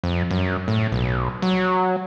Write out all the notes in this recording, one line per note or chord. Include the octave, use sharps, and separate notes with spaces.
F2
F#2
A2
B1
F#3